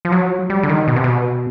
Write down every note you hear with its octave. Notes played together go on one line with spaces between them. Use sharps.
F3
F#3
G3
D3
D#3
B2
C3
B2